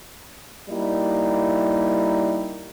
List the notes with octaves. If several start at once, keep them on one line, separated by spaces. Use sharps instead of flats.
G3 A#3 D#4 E4